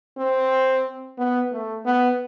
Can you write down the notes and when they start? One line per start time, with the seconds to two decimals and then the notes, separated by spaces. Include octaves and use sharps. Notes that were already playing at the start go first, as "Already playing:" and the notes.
0.18 C4
1.18 B3
1.52 A3
1.85 B3